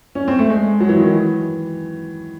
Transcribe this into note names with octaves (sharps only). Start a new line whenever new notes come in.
C#4
C4
A3
G#3
F#3
E3
D#3
E3